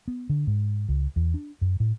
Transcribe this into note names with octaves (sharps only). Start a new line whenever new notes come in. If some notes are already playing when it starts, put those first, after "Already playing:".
B3
D3
G#2
C#2
E2
D4
F#2
A2